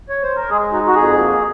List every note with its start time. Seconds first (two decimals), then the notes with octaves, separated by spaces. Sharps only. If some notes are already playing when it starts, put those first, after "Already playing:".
0.09 C#5
0.23 C5
0.36 A#4
0.50 G#3 G#4
0.72 D#4 F#4
0.87 F#4
0.95 F2 G#4
1.18 A#3